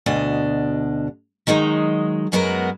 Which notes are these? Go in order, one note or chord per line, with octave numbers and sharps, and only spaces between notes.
D2 B2 D4 D#5
D#3 F#3 G#3 D#4
F#2 F#3 G#3 B3 F#4 A#4